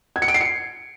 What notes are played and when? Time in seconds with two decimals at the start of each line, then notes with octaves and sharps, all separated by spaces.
0.16 G#6
0.22 C#7
0.28 D7
0.34 C7
0.41 C#7